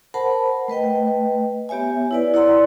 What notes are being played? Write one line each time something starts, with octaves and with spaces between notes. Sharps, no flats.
A#4 C5 F#5 A5 B5
A3 B4 D#5 G5
B3 G4 C#5 E5 G#5
E4 B4 D5
E4 C#5 D5 F#5 A#5 C6